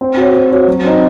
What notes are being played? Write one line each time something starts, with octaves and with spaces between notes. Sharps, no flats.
C4
F#4 C#5
C4
F#4 C#5
F#3
C4 D#4